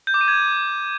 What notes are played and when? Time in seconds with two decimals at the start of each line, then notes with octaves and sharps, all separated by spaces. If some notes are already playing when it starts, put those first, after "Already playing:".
0.07 G6
0.14 D6
0.21 D#7
0.28 G#6